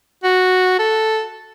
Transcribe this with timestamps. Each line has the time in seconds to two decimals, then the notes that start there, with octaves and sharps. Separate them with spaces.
0.24 F#4
0.79 A4